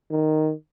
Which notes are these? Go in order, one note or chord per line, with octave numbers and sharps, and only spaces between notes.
D#3